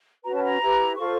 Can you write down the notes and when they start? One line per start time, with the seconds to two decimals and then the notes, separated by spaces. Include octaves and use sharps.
0.23 C#4 F#4 B4 A#5
0.34 A5
0.43 A#5
0.60 E4 G4 B4
0.97 F4 A4 C5 C#6